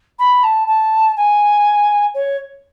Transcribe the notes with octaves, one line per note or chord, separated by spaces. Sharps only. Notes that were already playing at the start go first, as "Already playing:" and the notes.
B5
A5
A5
G#5
C#5